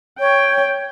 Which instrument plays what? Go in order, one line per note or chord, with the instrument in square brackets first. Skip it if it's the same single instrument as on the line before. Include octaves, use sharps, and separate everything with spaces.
[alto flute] C#5 [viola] G5